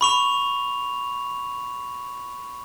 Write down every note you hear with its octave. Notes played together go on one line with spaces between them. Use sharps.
B5 C#6 F7